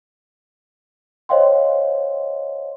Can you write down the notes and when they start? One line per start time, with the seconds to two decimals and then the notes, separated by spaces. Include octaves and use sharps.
1.29 C5 C#5 D#5 F5 G5 C6